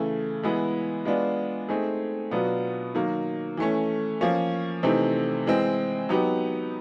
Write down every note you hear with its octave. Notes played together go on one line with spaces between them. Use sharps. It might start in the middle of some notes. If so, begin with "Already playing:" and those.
Already playing: C#3 E3 A3
E3 G#3 B3 E4
G#3 B3 D4 F4
A3 C4 D#4 G#4
B2 F#3 B3 D4 F4
D#3 F#3 A#3
E3 A3 C#4
F3 A#3 C#4
C3 E3 A3 C4 D#4
E3 G#3 C4
F#3 B3 D#4 G4